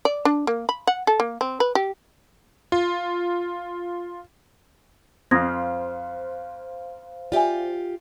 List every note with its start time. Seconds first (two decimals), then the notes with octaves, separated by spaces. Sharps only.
0.05 D5
0.25 D4
0.47 A#3
0.69 B5
0.87 F#5
1.07 A4
1.20 A#3
1.41 C4
1.60 B4
1.75 G4
2.72 F4
5.31 F2 C5 F5 D#6 G#6 A#6
7.32 F4 G4 D5 E5 G#5